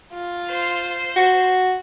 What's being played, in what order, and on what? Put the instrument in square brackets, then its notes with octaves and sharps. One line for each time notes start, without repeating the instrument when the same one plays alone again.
[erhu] F4
[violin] C5 C6
[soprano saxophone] F#4